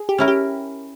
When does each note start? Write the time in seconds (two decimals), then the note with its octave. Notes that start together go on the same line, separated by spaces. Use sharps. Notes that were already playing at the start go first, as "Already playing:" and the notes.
Already playing: G#4
0.09 G4
0.18 C#4 E4 A#4
0.28 G4